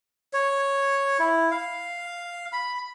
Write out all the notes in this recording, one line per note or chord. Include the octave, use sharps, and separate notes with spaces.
C#5
E4
F5
B5